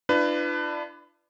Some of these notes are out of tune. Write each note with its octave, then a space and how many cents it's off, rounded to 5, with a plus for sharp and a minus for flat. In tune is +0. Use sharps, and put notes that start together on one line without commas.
D4 +20 F4 -45 B4 +20